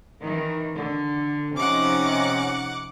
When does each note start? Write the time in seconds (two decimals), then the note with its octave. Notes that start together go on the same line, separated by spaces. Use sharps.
0.21 D#3 E3
0.77 D3
1.56 C3 F3 C#4 D#4 F#5 D6